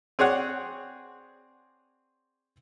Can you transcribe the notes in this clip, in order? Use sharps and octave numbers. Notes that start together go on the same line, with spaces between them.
C4 G#4 C#5 D5 F#5